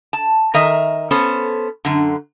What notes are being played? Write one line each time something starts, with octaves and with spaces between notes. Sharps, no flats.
A5
D#3 A#4 D#5 E5
B3 C#4 A4 C5
F#2 D3